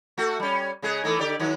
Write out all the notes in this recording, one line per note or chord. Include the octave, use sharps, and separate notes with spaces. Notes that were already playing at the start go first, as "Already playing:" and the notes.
A3 F#4
G3 C#4
C#3 G#3 G#4
E3 A3 D#4
D3 G4 D5
D#3 F#3